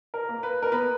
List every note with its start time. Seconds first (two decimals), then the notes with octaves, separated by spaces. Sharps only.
0.14 A#4
0.29 A#3
0.43 B4
0.62 A#4
0.72 B3 B4